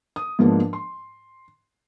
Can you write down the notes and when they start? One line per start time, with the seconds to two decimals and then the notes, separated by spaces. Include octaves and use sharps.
0.16 D#6
0.39 G#2 F3 G#3 A#3 B3 D4
0.73 C6